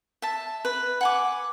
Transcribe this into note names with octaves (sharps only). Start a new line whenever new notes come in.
E5 A5
B4 B5
F#5 G#5 D6